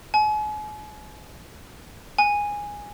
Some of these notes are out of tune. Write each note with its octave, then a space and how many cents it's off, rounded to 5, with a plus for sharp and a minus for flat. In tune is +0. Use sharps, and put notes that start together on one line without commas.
G#5 +40
G#5 -10